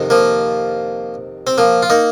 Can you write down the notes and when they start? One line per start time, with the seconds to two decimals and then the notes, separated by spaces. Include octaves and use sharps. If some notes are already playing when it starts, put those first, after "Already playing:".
Already playing: F2 C3 D#3
0.10 F3 A#3
1.47 C4
1.58 F3 A#3
1.83 F4
1.90 A#3 D#4